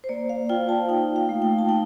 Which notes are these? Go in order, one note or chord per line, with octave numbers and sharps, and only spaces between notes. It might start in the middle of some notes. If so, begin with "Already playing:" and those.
C5
A#3 D5
F5
F4 G5
A5
D#4 G5
F5
A3
G5
A5
D#4 G5